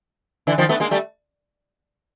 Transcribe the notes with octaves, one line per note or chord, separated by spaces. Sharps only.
D3 E3
D#3 F3
A3 B3
G#3 A#3
G3 A3